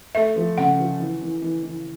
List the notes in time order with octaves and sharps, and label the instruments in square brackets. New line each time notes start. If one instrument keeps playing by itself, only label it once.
[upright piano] A3 [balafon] E5
[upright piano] F3
[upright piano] C#3 [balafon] F#5
[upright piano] F3
E3
E3
E3
E3